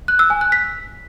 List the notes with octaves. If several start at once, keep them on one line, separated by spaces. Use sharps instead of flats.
F#6
E6
G#5
F#6
B6